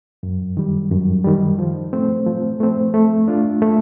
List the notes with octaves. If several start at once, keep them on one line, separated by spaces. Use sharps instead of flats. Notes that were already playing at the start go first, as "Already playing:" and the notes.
F#2
D#3 G3
F#2
D#3 G3
F3
A3 C4
F3
A3 C4
A3
D4 F4
A3